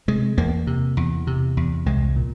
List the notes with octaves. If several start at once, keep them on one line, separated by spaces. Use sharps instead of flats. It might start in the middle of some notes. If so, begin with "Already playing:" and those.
C3 G#3
E2 A#3
C3
E2
C3
E2
C2 G#3
A#2